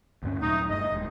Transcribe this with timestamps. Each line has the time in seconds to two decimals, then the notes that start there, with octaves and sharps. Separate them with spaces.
0.23 D2 G2 C#4
0.42 D#2 A#2 F#3 A3 D#4
0.70 F#1 G2 A3 D#5
0.92 D#1 G#3